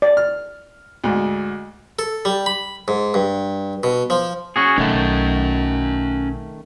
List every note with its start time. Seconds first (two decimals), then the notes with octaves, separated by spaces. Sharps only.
0.02 D5
0.17 F6
1.04 D2 G#2
1.99 A4
2.25 G3
2.46 B5
2.88 G#2
3.14 G2
3.83 B2
4.10 F3
4.56 C#4 F#4 G#4
4.78 B1 D#3 A3 C#4 F#5